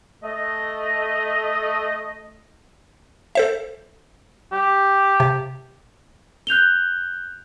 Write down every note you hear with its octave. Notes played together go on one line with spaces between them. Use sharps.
A3 D#5
A4 C5 E5
G4
C3
F#6 G6 F7 G7